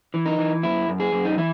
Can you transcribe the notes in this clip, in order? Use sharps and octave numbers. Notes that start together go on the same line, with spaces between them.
E3
D#4
E3
F#2 E4
F#2
G#4
F#2
D#4
E3 E4